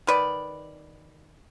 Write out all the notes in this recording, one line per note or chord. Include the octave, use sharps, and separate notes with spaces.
D#3 B4 D5